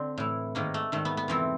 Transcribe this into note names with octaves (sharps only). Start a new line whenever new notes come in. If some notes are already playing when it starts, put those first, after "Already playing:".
Already playing: D3 C4
A2 E3
G#2 D#3 A#3
A3
G#2 D#3 A3
B3
B3
F2 C3 E3 C4